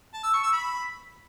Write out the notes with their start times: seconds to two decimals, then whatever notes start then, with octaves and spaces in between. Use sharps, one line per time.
0.14 A5
0.23 E6
0.33 C#6
0.43 E6
0.53 B5